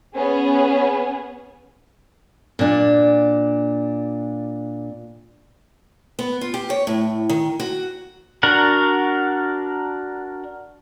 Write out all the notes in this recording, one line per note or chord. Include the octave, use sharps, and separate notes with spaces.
B3 C#4 G#4
A#2 D4
B3
F4
G4
C#5
A2
D#3
F#4
D4 F#4 A#4 F#5